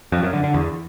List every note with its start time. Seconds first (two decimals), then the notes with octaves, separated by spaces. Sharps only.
0.12 F2
0.23 F#2
0.33 D3
0.44 D3
0.54 E2